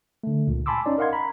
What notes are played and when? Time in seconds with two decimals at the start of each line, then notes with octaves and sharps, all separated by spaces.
0.23 D3 A3
0.47 C#2 A#2
0.66 G#5 A5 B5 C6 D6 E6
0.86 C#4 D#4 D5
0.98 A#4 D#5 F5 F#5 C6 G#6
1.13 A#5 B5